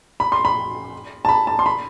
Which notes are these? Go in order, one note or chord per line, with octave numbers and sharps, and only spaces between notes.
B5
C6
B5
A5
B5
A5
C6
B5